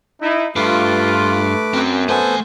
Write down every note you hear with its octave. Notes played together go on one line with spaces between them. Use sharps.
D#4 E4
G2 A3 F4 B4 D6
F#2 C4
A3 B3 A4 C5 G#5